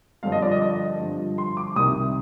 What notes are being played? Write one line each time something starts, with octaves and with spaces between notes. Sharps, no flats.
G2 D3 F3 F5
D#5
D5
D#5
D#5
G2 D3 F3
C6
D6
C2 C3 D#3 D#6